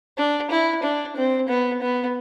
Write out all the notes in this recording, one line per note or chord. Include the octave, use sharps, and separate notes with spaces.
D4
E4
D4
C4
B3
B3